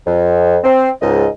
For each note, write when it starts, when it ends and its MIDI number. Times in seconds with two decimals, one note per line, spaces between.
0.07 0.58 41
0.63 0.90 60
1.02 1.27 37
1.02 1.27 44
1.02 1.27 75